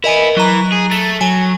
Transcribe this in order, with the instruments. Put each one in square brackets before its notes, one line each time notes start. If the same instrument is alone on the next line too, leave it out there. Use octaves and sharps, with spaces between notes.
[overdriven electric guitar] B3 E4 [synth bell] A#4 D#5 G#5
[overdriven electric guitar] E3 [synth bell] F#3 A#5
[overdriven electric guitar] G#4
[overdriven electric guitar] A3 [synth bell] A6
[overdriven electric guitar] F#3 [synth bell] G#5